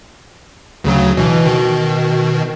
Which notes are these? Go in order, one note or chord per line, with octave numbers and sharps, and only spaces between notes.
D2 C#3 F#3
B2 E3
B2 D#3